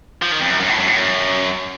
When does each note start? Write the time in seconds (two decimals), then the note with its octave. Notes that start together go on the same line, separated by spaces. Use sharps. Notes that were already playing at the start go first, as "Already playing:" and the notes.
0.22 F3
0.32 D#3
0.41 F2
0.50 F#2
0.60 F#2
0.68 A2
0.78 F#2
0.87 A2
0.96 F#2